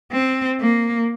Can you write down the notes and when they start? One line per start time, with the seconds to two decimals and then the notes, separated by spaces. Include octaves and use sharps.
0.12 C4
0.61 A#3